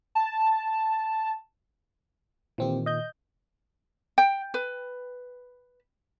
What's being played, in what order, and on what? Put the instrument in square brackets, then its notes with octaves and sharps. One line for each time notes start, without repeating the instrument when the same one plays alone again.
[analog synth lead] A5
[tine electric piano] A#2 D#3 [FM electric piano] E3 C4 G4
[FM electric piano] D#5 G6
[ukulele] G5
B4